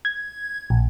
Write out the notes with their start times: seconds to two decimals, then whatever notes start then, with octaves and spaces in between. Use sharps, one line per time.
0.05 G#6
0.70 A#1